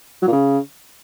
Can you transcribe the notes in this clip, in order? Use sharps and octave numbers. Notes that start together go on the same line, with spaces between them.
F#3
A#2
C#3